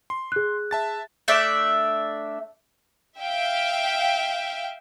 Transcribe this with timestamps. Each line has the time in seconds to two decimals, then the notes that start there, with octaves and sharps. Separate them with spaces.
0.10 C6
0.32 G#4 F#6
0.71 E5 A5 A6
1.28 A3 D4 D5 E5
3.19 E5 F5 G5